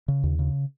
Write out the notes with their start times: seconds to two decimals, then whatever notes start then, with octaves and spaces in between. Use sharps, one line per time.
0.08 C#3
0.23 D#2
0.39 C#3